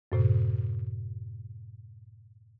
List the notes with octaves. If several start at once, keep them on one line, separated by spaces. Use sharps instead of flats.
F#2 A2 C3